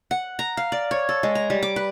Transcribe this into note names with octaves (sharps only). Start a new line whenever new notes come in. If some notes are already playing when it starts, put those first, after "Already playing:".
F#5
A#5
F5
D5
C#5
A4
G#3
A#5
G3
D6
B4